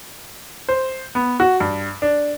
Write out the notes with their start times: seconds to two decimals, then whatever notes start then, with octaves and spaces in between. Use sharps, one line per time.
0.69 C5
1.15 B3
1.40 F#4
1.60 G2
2.02 D4